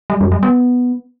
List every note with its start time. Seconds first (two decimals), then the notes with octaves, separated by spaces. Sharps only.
0.10 G3
0.21 F2
0.32 G3
0.43 B3